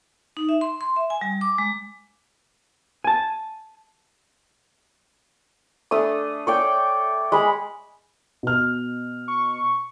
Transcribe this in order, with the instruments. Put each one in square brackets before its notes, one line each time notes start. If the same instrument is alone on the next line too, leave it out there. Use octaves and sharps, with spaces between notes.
[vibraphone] D#4
E5
C6
C6
E5
G#5
G3
D6
G#3
[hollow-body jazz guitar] G#5 A5
[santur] A3 D4 D#6
C#5 D5 G5
G#3 B5
[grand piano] B2 F6
[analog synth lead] C#6